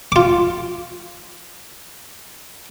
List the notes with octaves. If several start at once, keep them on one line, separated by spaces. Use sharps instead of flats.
F4 D6